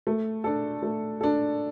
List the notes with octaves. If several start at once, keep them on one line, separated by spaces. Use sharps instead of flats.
A3
D4 A4
A3
D4 A4